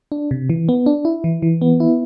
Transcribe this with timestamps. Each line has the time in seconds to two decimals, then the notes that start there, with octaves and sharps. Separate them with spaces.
0.12 D4
0.31 C3
0.50 E3
0.69 B3
0.86 D4
1.05 E4
1.24 E3
1.42 E3
1.61 B3
1.80 E4